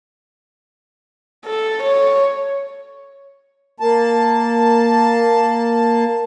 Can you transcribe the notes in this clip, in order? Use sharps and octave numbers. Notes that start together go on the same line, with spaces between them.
A4
C#5
A#3 A5